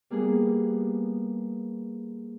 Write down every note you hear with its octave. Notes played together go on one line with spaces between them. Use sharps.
G3 A#3 B3 G#4